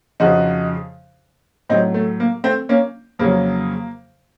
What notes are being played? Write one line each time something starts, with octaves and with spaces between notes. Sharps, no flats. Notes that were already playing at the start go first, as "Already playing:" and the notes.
F2 C#3 F3 D#4 F#4
A2 F#3 C4 D#4
A3
A#3
A3 C4
A#3 C#4
F2 C#3 F#3 A#3